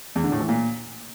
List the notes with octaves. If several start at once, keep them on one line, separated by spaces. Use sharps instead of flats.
E2
D3
A2
E3
A#2